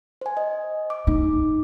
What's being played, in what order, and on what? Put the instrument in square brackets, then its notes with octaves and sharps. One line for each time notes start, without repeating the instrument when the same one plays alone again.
[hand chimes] C5 G#5
D#5
D6
[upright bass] D#4